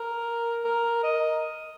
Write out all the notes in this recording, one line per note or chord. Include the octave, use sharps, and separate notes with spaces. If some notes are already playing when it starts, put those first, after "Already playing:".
Already playing: A#4
A#4
D#5